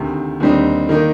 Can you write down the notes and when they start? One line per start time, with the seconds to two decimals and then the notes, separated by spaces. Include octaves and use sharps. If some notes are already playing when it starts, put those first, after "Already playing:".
Already playing: D2 C3 D#3
0.40 D#2 D3 G3 C4 D#4
0.89 D#3 A#3 D#4